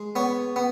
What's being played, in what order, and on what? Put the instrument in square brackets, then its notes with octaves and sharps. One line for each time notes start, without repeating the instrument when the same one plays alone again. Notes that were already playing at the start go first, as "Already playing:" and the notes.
Already playing: [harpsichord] G#3
B3 C#5
B3